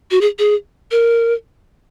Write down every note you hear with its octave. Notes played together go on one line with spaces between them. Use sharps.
F#4
G#4
G#4
A#4